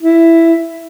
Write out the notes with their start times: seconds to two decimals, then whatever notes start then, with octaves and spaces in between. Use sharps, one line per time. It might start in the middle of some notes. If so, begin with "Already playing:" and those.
0.02 E4